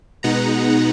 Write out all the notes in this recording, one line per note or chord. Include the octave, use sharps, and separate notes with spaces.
B2 G#3 B3 D#4 F#5 A#5